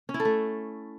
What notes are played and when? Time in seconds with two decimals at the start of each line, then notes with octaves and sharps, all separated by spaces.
0.09 C#4
0.14 E4
0.20 A4
0.25 A3